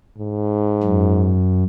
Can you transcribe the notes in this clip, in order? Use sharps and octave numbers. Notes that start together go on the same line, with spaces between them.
G#2
F#2